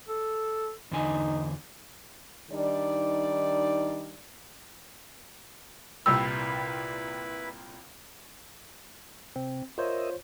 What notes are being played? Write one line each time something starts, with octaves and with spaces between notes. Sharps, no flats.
A4
E2 D3 D#4 G#5
D#3 G3 D4 D#4 D5
C2 A#2 G3 E4 B4 E6
C3 C4
F4 A#4 C5 C#5 D#5 E5